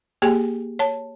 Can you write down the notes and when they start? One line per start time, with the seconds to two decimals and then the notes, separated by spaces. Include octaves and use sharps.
0.22 A#3 G4 G#4 G5 G#5
0.79 C#5 A5